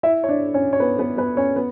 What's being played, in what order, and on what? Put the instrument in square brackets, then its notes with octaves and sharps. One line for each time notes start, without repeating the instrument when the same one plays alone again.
[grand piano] E4 E5
C#5
D4 D5
C#4 C#5
C#5
B3 B4
B3 B4
B3 B4
C#4 C#5
B3